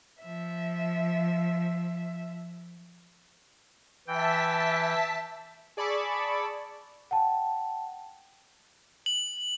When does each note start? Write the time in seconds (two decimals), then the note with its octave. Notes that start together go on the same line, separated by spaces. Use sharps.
0.22 F3 E5
4.07 E3 E5 G5 A5 B6
5.77 G#4 D5 A5 B5 C#6 E6
7.11 F#5 G5 A5
9.06 F#7